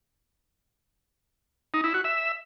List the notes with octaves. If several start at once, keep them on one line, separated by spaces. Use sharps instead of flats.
D#4
E4
F#4
E5